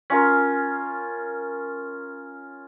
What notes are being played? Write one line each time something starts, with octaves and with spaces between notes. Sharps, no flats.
C#4 F4 A#4